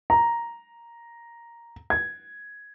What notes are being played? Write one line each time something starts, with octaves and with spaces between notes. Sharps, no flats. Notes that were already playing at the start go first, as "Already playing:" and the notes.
A#5
G#6